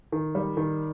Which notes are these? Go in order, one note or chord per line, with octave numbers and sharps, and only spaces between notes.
D#3
G3
D#3